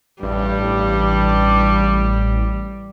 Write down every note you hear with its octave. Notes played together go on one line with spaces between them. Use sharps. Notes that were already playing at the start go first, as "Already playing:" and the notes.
A1 G2 G3